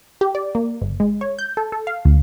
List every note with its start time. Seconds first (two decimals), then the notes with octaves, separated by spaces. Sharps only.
0.21 G4
0.35 D5
0.55 A#3
0.82 G1
1.00 G#3
1.21 C#5
1.39 G6
1.57 A4
1.72 A4
1.87 F5
2.05 D2